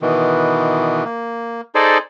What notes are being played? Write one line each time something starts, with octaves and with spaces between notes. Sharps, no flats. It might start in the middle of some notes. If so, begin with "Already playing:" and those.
B2 D#3 E3
A#3
D#4 G#4 A4 C5 D5